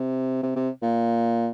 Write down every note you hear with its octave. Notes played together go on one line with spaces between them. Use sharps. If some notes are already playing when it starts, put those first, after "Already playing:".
Already playing: C3
C3
C3
A#2